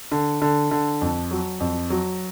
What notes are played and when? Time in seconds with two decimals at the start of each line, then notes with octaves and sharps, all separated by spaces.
0.12 D3
0.42 D3
0.71 D3
1.01 F2
1.31 F#3
1.60 F2
1.90 F#3